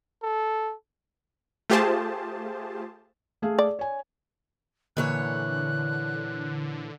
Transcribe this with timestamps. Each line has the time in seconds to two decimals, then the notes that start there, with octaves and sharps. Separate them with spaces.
0.22 A4
1.70 A3 F4 G4 G#4 C5 A5
3.42 A3 G#4 F5
3.59 D5
3.79 C#5 G#5
4.97 A#2 D3 E3 C#5 F#6